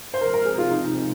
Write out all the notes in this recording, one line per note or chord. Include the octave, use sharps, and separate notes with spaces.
C5
C3 F3 G#3 C4 A#4
A#4
G#4
F4
D#4